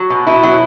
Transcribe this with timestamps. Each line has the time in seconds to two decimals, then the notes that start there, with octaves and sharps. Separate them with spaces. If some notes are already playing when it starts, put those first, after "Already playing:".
Already playing: F#3
0.10 B2
0.27 B2 E4
0.43 F#3